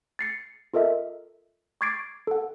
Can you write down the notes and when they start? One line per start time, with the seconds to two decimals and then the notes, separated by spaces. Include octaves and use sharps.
0.19 A6 C7 C#7
0.74 F4 A4 A#4 D#5 E5
1.81 C#6 D6 G#6 A6 C7 D7
2.27 A4 F#5